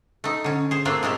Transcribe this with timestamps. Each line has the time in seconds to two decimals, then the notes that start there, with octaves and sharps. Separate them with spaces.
0.24 A3 D#4
0.44 D3 C#4
0.71 G#4 C5
0.85 A3 A#3 C4 D4 F4
1.03 F3 G#3 A3 G4